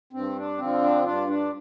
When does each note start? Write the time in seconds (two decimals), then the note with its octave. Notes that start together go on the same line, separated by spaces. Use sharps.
0.13 G2 C4
0.36 D4
0.58 D3 F3 C4
0.81 D4
1.04 G2 D4 F4
1.27 D4